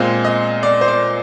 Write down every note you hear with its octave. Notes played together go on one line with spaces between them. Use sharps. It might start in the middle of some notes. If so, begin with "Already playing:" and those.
Already playing: A#2 G#3 C4 F5
D#5
D5
C5
D5